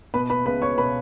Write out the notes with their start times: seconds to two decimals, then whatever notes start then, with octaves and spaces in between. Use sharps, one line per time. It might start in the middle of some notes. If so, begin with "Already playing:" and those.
0.14 B2 B4 B5
0.30 B4 B5
0.46 C#2 B4 B5
0.62 C#5 C#6
0.78 B2 B4 B5